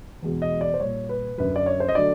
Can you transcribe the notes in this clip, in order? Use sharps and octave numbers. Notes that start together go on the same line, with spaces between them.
E2 B2 G#3
D#5
D5
C5
A#2 G3 C#5
B4
F#2 D3 F#3 B4
D5
C#5
C5
D#5
D3 F#3 A3 D5